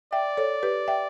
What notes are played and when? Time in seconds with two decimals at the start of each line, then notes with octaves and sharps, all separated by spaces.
0.13 D5 E5 G5
0.37 A4 C#5
0.63 G4 B4
0.88 E5 G5